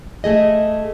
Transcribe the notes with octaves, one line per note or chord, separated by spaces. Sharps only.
A3 G#4 D#5